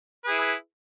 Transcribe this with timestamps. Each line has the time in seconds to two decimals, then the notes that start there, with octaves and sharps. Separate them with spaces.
0.25 B4
0.27 G#4
0.30 E4